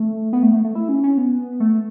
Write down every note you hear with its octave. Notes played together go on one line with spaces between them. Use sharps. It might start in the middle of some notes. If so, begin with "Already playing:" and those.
Already playing: A3
B3
A3
A3
A3
E4
C#4
C#4
B3
A3